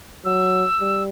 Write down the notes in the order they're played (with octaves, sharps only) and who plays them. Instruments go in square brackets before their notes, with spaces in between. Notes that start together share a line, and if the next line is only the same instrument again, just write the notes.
[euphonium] F#3 [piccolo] E6
[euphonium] G3